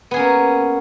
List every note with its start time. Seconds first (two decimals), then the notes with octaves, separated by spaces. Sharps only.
0.11 B3
0.14 G#4
0.16 C#4
0.19 A#3